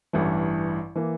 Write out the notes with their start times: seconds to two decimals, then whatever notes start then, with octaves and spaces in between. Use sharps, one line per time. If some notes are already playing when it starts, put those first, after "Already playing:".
0.13 A1 G2 E3
0.96 E3 A#3